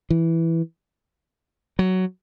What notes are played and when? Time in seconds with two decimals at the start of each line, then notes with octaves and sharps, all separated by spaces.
0.10 E3
1.79 F#3